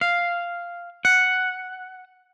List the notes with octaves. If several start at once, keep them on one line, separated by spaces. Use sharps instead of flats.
F5
F#5